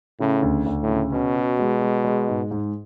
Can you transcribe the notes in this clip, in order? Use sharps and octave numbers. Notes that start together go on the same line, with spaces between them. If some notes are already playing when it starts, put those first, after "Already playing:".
A2 C#3
D2
D2
A2
C#3
B2 C#4
F#4
G#3
G#3
G#3
G#2
G#2